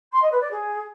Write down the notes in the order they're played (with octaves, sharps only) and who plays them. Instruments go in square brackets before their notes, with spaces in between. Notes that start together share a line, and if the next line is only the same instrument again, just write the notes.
[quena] C6
D#5
B4
D5
G#4